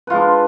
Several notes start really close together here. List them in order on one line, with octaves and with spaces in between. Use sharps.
B4 F4 G#3 D4